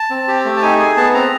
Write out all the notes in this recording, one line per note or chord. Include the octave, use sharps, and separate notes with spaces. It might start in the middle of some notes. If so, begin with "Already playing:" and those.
Already playing: A5
C4
G4
A3
A5
D#4 G#5
G#4 G#5
B3 A5
C4 A#5